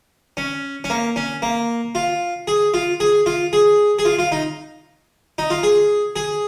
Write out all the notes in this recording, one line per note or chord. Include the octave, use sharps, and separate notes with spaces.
C#4
C#4
A#3
C#4
A#3
F4
G#4
F4
G#4
F4
G#4
G#4
F4
F4
D#4
D#4
F4
G#4
G#4